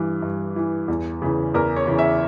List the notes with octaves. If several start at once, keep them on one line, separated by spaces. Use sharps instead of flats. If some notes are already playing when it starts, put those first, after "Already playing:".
Already playing: G2 E3
G2
E3
E2
C#3 E3
E2 A#4
C#5
C#3 E3
E5